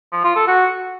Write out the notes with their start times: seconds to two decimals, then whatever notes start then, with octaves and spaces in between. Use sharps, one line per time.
0.12 F3
0.24 F4
0.36 A4
0.48 F#4